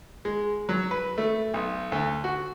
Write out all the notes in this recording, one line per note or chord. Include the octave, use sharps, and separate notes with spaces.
G#3
F#3
B4
A3
B1
D2
F#4